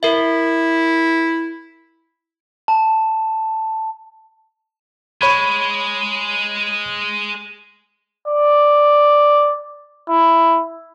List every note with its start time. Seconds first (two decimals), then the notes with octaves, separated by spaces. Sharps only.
0.03 E4 A#4 E5
2.68 A5
5.21 G#3 C#5 B5 G#6
8.27 D5
10.09 E4